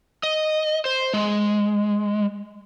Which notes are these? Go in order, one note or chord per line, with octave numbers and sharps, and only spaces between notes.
D#5
C5
G#3